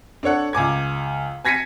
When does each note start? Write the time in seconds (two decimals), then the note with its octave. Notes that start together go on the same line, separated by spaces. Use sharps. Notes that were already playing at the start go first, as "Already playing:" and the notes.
0.23 D4 A4 C#5 F#5
0.53 C#2 G#5 D6 G#6
1.45 G#5 G#6 A#6 B6 C#7 D#7